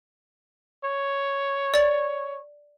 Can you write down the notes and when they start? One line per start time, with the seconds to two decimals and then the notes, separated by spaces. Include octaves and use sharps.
0.85 C#5
1.74 D5 A6